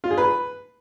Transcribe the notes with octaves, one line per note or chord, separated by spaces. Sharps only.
F4
G#4
B4